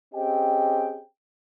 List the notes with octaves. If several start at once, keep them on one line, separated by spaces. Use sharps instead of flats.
C4 C#4 G4 G#4 D#5 G5